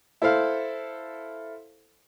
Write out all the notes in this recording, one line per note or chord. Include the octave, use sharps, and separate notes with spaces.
E4 A4 C5 F5